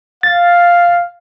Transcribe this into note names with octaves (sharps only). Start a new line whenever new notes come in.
F5 A6